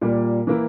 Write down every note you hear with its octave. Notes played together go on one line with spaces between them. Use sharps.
A#2 G3 A#3
E3 A#3 E4